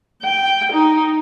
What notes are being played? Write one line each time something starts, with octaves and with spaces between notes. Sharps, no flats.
G5
D#4